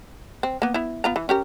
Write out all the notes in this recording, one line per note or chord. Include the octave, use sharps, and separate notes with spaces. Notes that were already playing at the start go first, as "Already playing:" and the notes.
C4
A#3 B3
B3 E4
B3 F4 A#5
E3
C#4 G4 A#4